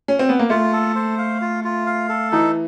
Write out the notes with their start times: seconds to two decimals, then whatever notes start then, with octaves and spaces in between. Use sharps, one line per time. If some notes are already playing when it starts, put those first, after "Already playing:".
0.08 C#4
0.19 C4
0.29 B3
0.39 A#3
0.50 A3 F4
0.73 A4
0.95 C5
1.18 F5
1.41 F4
1.64 F4
1.86 F5
2.09 A4
2.32 E3 D#4